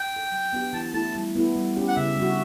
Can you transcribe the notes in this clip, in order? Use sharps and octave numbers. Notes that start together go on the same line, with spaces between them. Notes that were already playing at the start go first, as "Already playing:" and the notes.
Already playing: G5
D4 A4
F#3
B3 D4 G4
E3 A5
A3 E4 A4 A5
G3
B3 E4 A4
G3
C#4 G4
F#5
C#3 E5
G3 D4 F#4